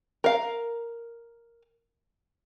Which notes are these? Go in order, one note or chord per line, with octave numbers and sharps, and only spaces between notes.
A#4 F5